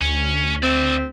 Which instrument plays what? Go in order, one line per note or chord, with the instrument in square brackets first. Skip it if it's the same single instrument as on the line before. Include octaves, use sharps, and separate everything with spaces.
[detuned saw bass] D2 [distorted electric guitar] C#4
[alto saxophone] C4 [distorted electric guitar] D5 E5